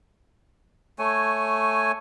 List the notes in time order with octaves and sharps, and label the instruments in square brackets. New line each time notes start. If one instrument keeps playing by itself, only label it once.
[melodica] A3 C#5 G#5